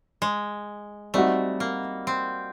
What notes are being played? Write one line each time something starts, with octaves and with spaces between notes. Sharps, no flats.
G#3
G3 A3 C4 D#4 F#4
A#3
C4